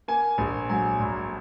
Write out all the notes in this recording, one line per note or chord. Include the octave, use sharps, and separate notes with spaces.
A#3 G#5
A#1
F#3 G#5
A#2